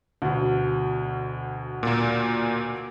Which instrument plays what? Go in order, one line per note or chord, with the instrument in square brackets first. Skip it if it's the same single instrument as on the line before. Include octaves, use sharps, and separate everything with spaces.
[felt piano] D2 B2
[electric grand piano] A#2 A#3